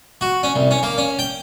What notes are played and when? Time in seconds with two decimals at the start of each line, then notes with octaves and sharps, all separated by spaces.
0.21 F#4
0.43 C#4
0.56 C2
0.71 C#4
0.83 A#3
0.98 C#4
1.19 G5